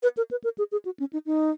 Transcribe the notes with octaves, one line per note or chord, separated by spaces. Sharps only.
B4
A#4
B4
A#4
G#4
G#4
F#4
C#4
D#4
D#4